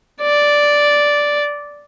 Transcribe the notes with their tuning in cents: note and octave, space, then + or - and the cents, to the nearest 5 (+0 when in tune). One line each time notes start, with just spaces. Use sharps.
D5 -5